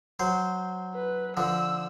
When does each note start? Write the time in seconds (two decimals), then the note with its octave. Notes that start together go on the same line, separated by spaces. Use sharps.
0.19 F#3 C5
0.95 B4
1.37 D3 F3 E6